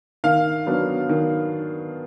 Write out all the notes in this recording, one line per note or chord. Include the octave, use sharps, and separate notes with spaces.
D#3 F5
F#3 B3 D4
D#3